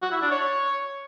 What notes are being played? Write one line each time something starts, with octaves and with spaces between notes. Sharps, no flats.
F#4
E4
D4
C#5